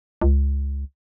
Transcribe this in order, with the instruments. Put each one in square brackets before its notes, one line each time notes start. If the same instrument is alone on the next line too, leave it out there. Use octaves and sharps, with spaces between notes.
[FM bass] C#2